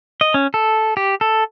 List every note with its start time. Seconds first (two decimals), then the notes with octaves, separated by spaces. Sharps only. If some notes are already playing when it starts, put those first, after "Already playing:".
0.21 D#5
0.34 C#4
0.54 A4
0.97 G4
1.21 A4